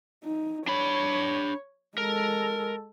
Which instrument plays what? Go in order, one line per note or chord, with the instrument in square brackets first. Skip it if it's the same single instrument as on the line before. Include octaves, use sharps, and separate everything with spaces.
[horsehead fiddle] D#4
[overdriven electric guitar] D4 B5 [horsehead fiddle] C#5
[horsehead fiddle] G#3 A4 [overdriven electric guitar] A#4